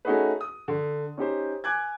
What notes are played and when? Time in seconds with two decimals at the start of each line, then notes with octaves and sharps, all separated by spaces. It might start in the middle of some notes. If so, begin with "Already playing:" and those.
0.05 A3 C#4 D#4 F#4 G#4 B4
0.41 D#6
0.68 D3
1.17 C#4 D#4 G4 C5
1.64 G#5 D6 F#6 G#6